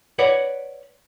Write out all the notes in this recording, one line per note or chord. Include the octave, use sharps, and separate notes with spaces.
B4 C#5 D5 F#5